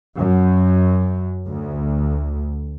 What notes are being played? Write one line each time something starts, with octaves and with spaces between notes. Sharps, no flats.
F#2
D2